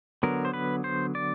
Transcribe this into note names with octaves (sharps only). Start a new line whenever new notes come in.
D3 F#3 B3 A#4
C5
B4
C5
D5